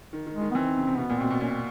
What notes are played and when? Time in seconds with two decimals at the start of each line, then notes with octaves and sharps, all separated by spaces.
0.13 D#3
0.26 D#3
0.35 G#3
0.41 D#3
0.51 B3
0.55 E3 C4
0.66 D#3
0.77 C#3
0.87 C3
0.98 B2 B3
1.09 A#2
1.19 B2 C4
1.30 B2
1.41 A#2 C#4
1.50 C4